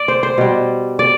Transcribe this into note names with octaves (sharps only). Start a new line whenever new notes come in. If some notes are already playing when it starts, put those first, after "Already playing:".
Already playing: D5
C5
C5
B2 G3
D5